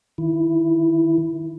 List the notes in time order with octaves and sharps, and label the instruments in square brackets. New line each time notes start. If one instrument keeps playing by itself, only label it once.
[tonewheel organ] D#3 E4